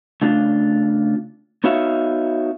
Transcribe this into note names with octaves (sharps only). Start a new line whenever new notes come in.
C#3 A3 D4 F4
B3 D#4 F#4 C#5 E5 F5